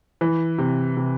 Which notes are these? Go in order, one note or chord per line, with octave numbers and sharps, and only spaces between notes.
E3
C3
C3